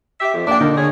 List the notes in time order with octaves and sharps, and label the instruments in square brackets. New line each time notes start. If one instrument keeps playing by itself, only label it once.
[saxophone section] G4 E5
F2
[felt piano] A#3 G5 [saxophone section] D4
[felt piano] D3 [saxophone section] A#3 D#4
[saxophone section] G#4 C#5